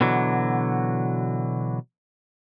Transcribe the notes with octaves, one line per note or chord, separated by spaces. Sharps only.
B2 D3 E3 F#3